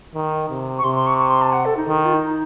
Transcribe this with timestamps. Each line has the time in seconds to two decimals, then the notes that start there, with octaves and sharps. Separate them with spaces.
0.15 D#3
0.50 C3
0.78 C#6
0.83 C3 C6
0.95 C6
1.07 C#6
1.18 C#6
1.30 C6
1.42 A5
1.53 F#5
1.65 A4
1.77 D#4
1.88 D#3
1.97 D#4
2.05 F4
2.14 D#4